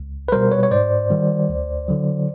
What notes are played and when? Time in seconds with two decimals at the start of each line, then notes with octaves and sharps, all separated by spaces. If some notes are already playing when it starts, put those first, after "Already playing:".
Already playing: C#2
0.28 B4
0.32 B2 G3 A#4 C5
0.51 B4 C#5
0.63 C#5
0.71 G#2 C5 D5
1.10 D#3 G3
1.49 D2
1.88 D3 F#3